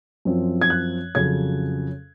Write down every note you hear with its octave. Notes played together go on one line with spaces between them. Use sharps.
F#2 F3 C4
G#6
F#6
F2 C#3 F#3 C#4 G#6